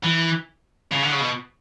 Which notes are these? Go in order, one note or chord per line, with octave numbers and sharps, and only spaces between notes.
E3
C#3
D3
C#3
B2